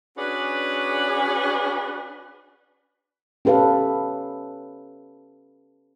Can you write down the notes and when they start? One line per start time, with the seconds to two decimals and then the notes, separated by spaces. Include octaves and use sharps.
0.18 C#4 D4 F#4 G#4 B4
3.45 C#4 G4 A4 B4 F5